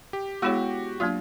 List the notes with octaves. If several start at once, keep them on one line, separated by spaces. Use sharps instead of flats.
G4
G#3 B3 E4 F#4 G#4 C#5
F#3 A#3 D4 F4